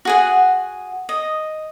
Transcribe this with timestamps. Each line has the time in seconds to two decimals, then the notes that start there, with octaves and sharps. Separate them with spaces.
0.05 F#4 G#4 F#5
1.09 D#5